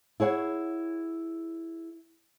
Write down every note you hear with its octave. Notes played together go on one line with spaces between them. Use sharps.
E4 G#4 C#5 F#5